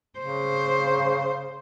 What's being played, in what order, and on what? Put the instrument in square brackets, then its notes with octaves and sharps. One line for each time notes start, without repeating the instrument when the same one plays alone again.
[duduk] C#3 [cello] C5